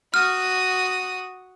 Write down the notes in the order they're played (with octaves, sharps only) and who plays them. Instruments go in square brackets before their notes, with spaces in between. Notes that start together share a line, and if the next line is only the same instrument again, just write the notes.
[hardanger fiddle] F#4 D#6 [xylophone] F6